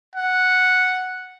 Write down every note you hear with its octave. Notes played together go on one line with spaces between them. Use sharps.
F#5